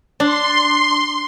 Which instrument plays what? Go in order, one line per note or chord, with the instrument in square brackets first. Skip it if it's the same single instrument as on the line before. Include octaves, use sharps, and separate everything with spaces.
[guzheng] D4 [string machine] C6